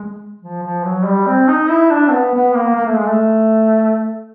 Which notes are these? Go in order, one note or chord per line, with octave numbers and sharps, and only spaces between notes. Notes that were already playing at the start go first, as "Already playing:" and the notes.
Already playing: G#3
F3
F3
F#3
G3
C4
D#4
E4
D4
C4
B3
B3
A#3
A#3
A3
G#3
A3